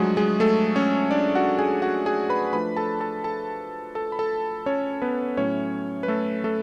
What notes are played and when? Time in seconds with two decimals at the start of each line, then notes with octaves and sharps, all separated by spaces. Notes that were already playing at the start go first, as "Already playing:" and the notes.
Already playing: F3 F#3 G#3 A3 D4 F#4 G#4
0.17 G#3 G#4
0.40 A3 A4
0.76 C#4 C#5
1.11 D4 D5
1.35 F#4 F#5
1.59 G#4 G#5
1.82 F#4 F#5
2.06 G#4 G#5
2.29 B4 B5
2.53 F3 A3 D4 B4 B5
2.77 A4 A5
3.00 A4 A5
3.24 A4 A5
3.95 A4 A5
4.12 B5
4.19 A4 A5
4.66 C#4 C#5
5.02 B3 B4
5.37 A2 F#3 A3 C#4 C#5
6.03 B4
6.08 A3 A4
6.44 A3 A4